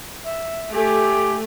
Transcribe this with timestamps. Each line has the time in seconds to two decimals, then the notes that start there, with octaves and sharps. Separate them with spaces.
0.24 E5
0.75 A3 G4 G#5